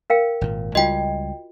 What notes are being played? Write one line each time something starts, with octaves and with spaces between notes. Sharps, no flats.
A#4 F5 G5
G#1 A#2
C#2 G3 F4 F#4 D#5 G5